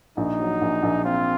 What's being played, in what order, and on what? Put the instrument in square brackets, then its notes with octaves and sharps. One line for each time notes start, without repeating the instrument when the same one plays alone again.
[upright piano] A#1 [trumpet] D#4
[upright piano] F#3
A#1
A#1
[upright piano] C4 [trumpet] F4